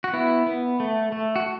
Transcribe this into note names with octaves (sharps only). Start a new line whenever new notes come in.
F#4
B3 E4
B3
A3
A3
F#4